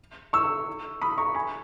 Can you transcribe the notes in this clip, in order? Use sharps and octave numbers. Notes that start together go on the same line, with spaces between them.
C#6 E6
B5 D#6
A#5 C#6
G#5 B5